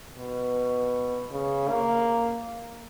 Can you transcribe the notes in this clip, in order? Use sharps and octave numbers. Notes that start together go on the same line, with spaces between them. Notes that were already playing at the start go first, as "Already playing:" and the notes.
B2
C#3
A#3